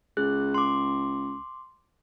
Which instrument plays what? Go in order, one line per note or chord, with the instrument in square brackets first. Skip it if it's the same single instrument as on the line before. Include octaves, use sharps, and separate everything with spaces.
[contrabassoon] C#2 [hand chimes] G#4 F#6
[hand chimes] C6 D6